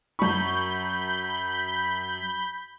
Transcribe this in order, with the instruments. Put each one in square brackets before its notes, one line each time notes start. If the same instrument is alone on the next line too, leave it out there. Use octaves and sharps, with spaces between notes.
[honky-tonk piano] F#2 C#6 [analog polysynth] B5 G6